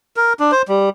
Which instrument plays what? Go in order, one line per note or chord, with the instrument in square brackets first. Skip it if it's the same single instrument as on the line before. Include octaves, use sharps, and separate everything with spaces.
[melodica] A#4
D4
C5
G3